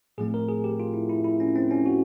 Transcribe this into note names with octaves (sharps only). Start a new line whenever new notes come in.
A2 F3 A3 C4 G#4
A#4
G#4
G4
F4
E4
E4
E4
C#4
C4
C#4
F#4